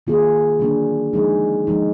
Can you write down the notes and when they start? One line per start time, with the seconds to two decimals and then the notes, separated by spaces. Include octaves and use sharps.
0.07 D#3 A#3 F4 G#4
0.59 D3 F#3 A#3 D4
1.13 F3 G#3 D#4 G#4
1.67 F3 G#3 D#4